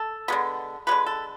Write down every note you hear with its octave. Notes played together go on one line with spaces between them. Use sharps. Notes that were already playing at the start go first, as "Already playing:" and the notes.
Already playing: A4
D3 G#3 B3
D3 G#3 B3 B4
A4